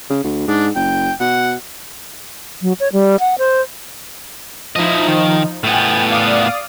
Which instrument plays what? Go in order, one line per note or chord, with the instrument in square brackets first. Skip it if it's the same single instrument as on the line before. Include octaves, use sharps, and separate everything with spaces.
[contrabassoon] C#3
D2
[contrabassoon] G#2 [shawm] D4
[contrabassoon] F#1 [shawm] G5
[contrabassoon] B2 [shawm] F#5
[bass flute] F#3
C#5
G3
F#5
C5
[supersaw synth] F3 D#4 [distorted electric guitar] E4 D#5
[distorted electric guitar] D#3
[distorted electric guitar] A2 B3 [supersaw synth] G5 G#5 A6
[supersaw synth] D5 F5 D#6